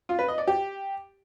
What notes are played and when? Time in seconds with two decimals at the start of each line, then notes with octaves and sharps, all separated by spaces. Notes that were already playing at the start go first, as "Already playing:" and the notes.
0.09 F4
0.19 B4
0.28 D#5
0.38 D5
0.47 G4